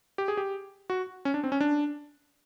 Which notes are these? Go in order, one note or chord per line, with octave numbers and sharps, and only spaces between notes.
G4
G#4
G4
F#4
C#4
D4
C4
C#4
D4